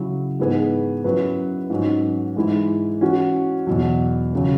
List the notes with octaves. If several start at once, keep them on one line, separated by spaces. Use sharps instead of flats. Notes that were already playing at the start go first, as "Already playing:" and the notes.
Already playing: C#3 F#3 E4
G#2 E3 B3 G#4 B4
F#2 F#3 E4 B4
G#2 F#3 C#4
G#2 E3 G#3 E4
E3 C#4 F#4
E2 B2 F#3
F#2 C#3 F#3